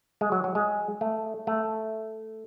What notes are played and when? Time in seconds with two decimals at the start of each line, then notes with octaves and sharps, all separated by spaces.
0.21 G#3
0.32 F#3
0.44 F#3
0.55 G#3
1.01 A3
1.47 A3